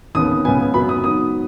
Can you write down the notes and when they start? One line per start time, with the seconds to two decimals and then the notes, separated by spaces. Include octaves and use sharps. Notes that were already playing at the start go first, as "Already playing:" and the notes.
0.15 D#2 C#3 B3 D#6
0.45 C#2 C#3 B3 G#5
0.74 F#2 F#3 B3 B5
0.89 D#6
1.04 G#2 F#3 B3 D#6